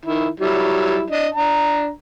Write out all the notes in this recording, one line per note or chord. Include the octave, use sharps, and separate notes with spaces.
D#3 E4
F#3 G3 E4
D4 D#5
D4 A#5